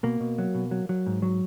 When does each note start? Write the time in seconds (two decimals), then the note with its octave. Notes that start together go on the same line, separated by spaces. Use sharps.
0.03 B2 A#3
0.20 B2
0.38 F#3
0.55 B2
0.71 F#3
0.89 F#3
1.07 G#2
1.22 F#3